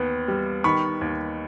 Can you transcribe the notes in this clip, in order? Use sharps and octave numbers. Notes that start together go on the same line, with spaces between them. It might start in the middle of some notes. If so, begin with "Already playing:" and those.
Already playing: D#2 B3
G3
D#3 B5 C#6
D#2